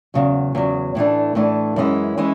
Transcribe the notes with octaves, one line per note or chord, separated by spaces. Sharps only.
E2 C#3 F#3
E2 C#3 F#3
A2 E3 A3 D4
A2 E3 A3 D4
F#2 E3 G#3 C#4 E4
E3 G#3 C#4 E4